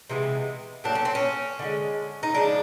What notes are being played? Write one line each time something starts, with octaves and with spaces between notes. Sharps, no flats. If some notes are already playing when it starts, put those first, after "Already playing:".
C3 E3 G#3 B3
A2 F#3 A#3 D4
C#4
C4
C#4
D3 F3 G#3
D#4
C#3 F3 G#3 D4